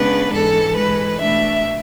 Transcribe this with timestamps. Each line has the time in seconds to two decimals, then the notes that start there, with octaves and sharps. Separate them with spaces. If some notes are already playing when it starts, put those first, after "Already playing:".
Already playing: C#3 G#3 B3 D4 B4
0.33 G#2 E3 G#3 A4
0.76 G#2 E3 G#3 B4
1.21 B2 A3 D4 E5